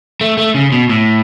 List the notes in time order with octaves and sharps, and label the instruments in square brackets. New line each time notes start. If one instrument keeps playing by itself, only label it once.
[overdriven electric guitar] A3
A3
C#3
B2
A2